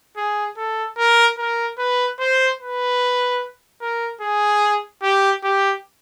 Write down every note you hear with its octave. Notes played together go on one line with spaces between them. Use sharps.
G#4
A4
A#4
A#4
B4
C5
B4
A#4
G#4
G4
G4